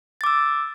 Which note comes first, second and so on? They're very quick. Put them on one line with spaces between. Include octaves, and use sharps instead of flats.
A6 D6 E6